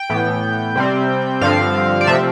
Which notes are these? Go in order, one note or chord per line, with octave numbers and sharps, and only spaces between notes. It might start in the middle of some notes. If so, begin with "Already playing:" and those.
Already playing: G5
A2 E3 B3
C3 G3 C4
G2 D3 F3 C4 F5
D5
C3 F3 A3 C4 E5